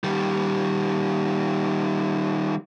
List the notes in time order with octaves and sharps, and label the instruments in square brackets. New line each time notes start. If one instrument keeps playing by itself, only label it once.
[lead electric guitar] D#3 G3